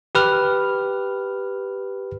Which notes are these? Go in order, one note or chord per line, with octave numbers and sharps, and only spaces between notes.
G4 B4 F6